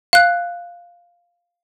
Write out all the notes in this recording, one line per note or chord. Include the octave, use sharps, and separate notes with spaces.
F5 F#6